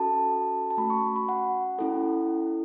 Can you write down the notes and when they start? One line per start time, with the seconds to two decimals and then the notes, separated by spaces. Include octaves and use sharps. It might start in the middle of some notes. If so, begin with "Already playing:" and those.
Already playing: C#4 F#4 A4 A5
0.70 A5
0.78 A3 C#4 F#4 B5
0.90 C#6
1.16 B5
1.29 F#5
1.79 C#4 E4 A4